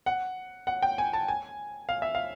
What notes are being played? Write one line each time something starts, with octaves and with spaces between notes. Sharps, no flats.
F#5
F#5
G5
G#5
A5
G#5
F5
E5
F5